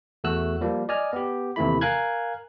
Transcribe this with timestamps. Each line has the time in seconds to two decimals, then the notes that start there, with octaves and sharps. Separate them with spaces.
0.24 E2 A3 F#4 E6 F#6
0.61 F3 G3 A#3
0.89 D5 D#5 G#5 F6
1.13 B3 G4
1.56 D#2 C3 E3 A3 E4 B5
1.81 A#4 F5 G#5 F#6 G#6